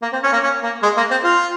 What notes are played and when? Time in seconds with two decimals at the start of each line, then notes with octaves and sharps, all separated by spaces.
0.02 A#3
0.13 C4
0.23 C#4
0.33 A#3
0.43 C#4
0.63 A#3
0.83 G#3
0.97 A#3
1.11 C4
1.24 F4